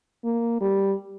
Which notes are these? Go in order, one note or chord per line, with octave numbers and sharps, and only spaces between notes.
A#3
G3